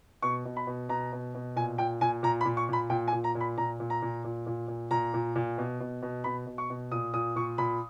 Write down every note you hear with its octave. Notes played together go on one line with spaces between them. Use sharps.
B2 C#6
B2
B5
B2
B2 A#5
B2
B2
A#2 G#5
A#2 G5
A#2 G#5
A#2 A#5
B5
A#2
C#6
A#2 B5
A#2 G5
G#5
A#2
A#5
A#2
B5
A#2 A#5
A#2
A#5
A#2
A#2
A#2
A#2
A#2 A#5
A#2
A#2
B2
B2
B2
B2 B5
B2
C#6
B2
A#2 D#6
A#2 D#6
A#2 C#6
A#2 B5